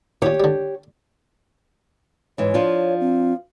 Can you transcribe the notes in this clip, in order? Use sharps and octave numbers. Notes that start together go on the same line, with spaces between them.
D#2 A#2 G4 C#5
D3 G3
G#2 E3 C#5
F3 D4 F4
C4